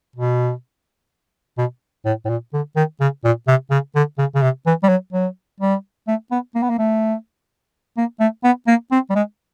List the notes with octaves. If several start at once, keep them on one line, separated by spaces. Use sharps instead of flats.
B2
B2
A2
A2
A#2
D3
D#3
C#3
A#2
C3
C#3
D3
C#3
C#3
C3
E3
G3
F#3
F#3
G3
A3
B3
A#3
B3
A#3
A3
A#3
A3
B3
A#3
C4
G3
G#3